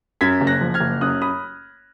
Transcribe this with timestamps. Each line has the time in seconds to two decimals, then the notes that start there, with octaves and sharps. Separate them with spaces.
0.21 F#2 G#6 B6
0.41 F#1
0.47 F#6 A#6
0.61 F3
0.74 F6 G#6
0.80 F#1
1.01 F#2 D#6 F#6
1.22 B5 D#6